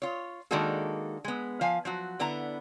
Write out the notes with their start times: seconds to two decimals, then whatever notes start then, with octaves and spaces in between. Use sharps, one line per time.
0.02 F4 C#5
0.51 D#3 G#3 A#3 D4 F#4 A4
1.24 G#3 B3
1.61 F3 F5 G#5
1.85 F3 F#3 F#4
2.19 D3 B3 E4 A#5